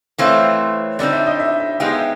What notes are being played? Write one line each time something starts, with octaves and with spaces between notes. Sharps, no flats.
E3 A3 C4 F4 C#5
D3 G3 C4 D#4 D5
E5
D#5
E5
E5
G#3 B3 D#4 G4 F5
E5